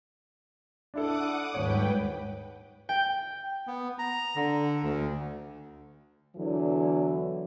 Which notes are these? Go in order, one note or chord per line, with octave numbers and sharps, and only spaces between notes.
D4 E4 A4 F#5 D6 D#6
D#1 G#2 B4 C#5 F#5 G5
G5
B3
A#5
D3
D2
E2 D3 E3 F#3